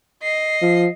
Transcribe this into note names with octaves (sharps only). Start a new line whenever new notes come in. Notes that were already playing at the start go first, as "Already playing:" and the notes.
D#5 C7
F3